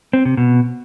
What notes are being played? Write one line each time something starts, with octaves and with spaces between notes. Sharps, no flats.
C4
C3
B2